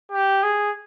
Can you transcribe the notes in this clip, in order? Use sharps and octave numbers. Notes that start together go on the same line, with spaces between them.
G4
G#4